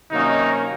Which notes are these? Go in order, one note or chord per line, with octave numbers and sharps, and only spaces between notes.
C3 D#3 F#3 A#3 C#4 D#4